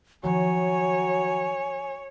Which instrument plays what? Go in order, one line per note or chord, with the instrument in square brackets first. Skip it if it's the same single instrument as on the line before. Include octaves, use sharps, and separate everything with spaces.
[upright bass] D#3 F3 [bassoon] F#3 [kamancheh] C#5 [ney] G#5